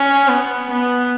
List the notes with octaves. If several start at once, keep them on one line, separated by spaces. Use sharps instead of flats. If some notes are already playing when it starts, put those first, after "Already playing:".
Already playing: C#4
B3
B3